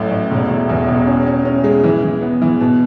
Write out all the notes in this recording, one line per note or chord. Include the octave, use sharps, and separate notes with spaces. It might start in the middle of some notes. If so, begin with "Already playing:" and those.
Already playing: A1 A2 F#3 A3
A1
E1
E1
E2
E1
C#4
C#4
C#4
G#3
E3
E3
B3
E3
B2